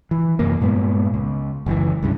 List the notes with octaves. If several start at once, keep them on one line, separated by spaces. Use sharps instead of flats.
E3
F#2 C3 E3 A#3
G2 A#2 G#3 B3
C#2
F#1 C#2 B2 E3
C2 G2 C#3